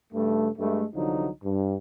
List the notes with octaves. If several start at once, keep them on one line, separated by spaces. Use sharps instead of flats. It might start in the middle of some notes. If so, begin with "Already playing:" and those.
G2 C#3 A3
G2 G#3 A3
C2 D3 F3 F#3 D#4
G2